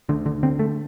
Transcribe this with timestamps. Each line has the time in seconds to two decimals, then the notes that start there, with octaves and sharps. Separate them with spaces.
0.09 D2 D3
0.26 D3
0.43 D3 C4
0.59 A3